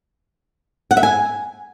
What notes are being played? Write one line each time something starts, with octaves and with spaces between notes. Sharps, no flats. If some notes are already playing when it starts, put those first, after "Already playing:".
F#5
E5
G#5